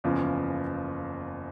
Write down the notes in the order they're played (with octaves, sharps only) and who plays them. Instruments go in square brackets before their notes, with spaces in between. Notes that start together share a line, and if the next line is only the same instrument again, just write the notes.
[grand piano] F#1 E2 C#3 F3